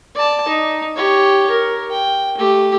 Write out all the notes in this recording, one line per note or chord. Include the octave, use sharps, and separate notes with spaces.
D5 A5
D#4
G4 C#5
A#4
G5
A3 G4